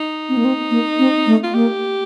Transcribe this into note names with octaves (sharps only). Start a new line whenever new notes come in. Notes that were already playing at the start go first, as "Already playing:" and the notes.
Already playing: D#4
C4
A#3
C4
A#3
C4
A3
F4
A#3 G4